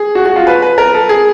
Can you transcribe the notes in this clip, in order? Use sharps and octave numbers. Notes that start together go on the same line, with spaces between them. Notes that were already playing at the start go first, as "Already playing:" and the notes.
Already playing: G#4
F#4
F#4
F4
B4
B4
A#4
A4
G#4